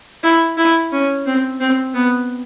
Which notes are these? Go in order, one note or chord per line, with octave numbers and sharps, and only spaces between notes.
E4
E4
C#4
C4
C4
B3